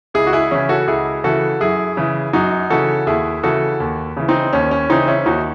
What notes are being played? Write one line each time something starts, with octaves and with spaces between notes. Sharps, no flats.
C#2 E4 G#4
F#4
E4 G#4
C#3 E3 C#4 E4
F#4 A4
C#2 E4 G#4
C#3 E3 F#4 A4
F#2 E4 G#4
C#3 E3
F#2 D#4 F#4
C#3 E3 F#4 A4
D#2 E4 G#4
C#3 E3 F#4 A4
D#2
C#3 E3
C4 D#4
D#2 C#4
C#4
C#3 E3 C4 D#4
C#4 E4
D#2 D#4 F#4